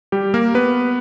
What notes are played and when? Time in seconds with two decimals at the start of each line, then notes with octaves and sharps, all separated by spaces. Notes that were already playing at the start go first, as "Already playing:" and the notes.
0.12 G3 G4
0.34 A#3 A#4
0.55 B3 B4